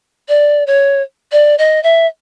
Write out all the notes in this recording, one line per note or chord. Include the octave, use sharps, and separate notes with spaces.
D5
C#5
D5
D#5
E5